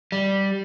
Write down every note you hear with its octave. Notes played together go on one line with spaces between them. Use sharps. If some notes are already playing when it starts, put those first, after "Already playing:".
G3